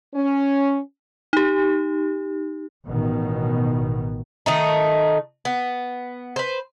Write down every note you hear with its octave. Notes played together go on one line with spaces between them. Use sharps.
C#4
D#4 G4
A1 B2 D#3
D#3 A3 D#4
B3
B4 C5